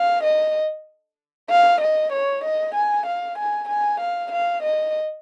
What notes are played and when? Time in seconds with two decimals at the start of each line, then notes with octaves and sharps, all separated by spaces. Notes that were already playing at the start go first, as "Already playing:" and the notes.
Already playing: F5
0.23 D#5
1.50 F5
1.81 D#5
2.13 C#5
2.44 D#5
2.75 G#5
3.06 F5
3.38 G#5
3.69 G#5
4.00 F5
4.32 F5
4.63 D#5